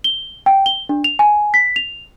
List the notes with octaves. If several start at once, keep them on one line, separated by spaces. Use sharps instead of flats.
G7
G5
G7
D4
F7
G#5
B6
F7